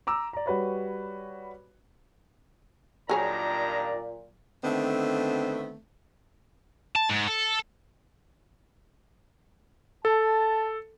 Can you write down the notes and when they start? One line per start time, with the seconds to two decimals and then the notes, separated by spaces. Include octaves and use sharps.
0.07 A#5 D6 E6
0.33 D5 A#5
0.46 G3 F#4 B4 C#5
3.09 G2 A#2 D#3 F#3 G#4 C#5 D5 A#5
4.64 D3 D#3 A3 B3 C4
6.95 A5
7.09 G#2
7.27 A4
10.05 A4 A5